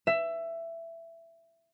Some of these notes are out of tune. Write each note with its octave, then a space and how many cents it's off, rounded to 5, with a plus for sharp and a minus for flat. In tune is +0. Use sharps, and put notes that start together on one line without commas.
E5 +15